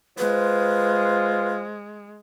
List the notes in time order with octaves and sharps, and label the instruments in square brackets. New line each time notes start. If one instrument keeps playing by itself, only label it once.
[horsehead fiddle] G#3 [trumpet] F4 [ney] B4 [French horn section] C5